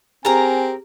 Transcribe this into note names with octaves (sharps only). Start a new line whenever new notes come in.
C4 G4 G#4 A#4 G#5 A#5